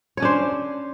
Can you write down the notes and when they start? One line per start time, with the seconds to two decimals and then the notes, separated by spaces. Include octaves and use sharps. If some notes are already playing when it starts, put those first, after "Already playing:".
0.17 C#5
0.20 C#4
0.22 D4
0.25 C5